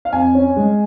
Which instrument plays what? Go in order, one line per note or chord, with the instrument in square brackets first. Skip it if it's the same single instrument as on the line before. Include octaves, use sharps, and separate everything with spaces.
[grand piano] F5
F2 G#5
C#4
G#3